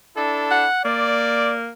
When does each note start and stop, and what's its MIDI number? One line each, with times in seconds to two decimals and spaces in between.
0.17 0.67 62
0.17 0.67 64
0.17 0.67 69
0.51 0.84 78
0.85 1.70 58
0.85 1.55 74